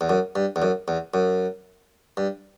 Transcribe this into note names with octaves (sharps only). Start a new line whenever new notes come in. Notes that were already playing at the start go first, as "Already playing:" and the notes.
E2
F#2
G2
E2
F#2
E2
F#2
G2